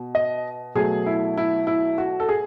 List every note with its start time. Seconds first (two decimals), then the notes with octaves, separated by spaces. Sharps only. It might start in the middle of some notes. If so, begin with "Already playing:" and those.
Already playing: B2
0.15 D#5
0.75 B2 F#3 A3 G#4
1.06 E4
1.37 E4
1.67 E4
1.98 F#4
2.20 A4
2.29 G#4